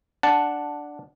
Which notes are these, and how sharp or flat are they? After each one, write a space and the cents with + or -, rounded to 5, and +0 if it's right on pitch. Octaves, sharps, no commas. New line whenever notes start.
D4 +0 F#5 +0 A5 +0